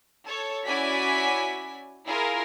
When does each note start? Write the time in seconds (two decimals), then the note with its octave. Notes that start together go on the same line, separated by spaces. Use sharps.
0.25 A4 C#5
0.65 C#4 E4 F#4 D5 G#5 B6
2.05 E4 F4 G#4 A#4 F5